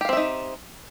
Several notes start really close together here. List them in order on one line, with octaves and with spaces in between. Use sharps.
G4 F5 C4 E5 D#4